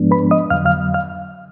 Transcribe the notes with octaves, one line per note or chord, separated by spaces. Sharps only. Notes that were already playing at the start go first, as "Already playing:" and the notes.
Already playing: G#2 F3 G#3 B3 D4
B4 B5
D#5 D#6
F2 D3 F#3 F5 F6
F5 F6
F5 F6